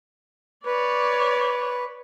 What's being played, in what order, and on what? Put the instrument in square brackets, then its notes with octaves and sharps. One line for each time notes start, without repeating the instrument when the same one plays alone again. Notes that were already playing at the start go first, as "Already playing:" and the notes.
[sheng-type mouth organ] B4 [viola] C#5 D5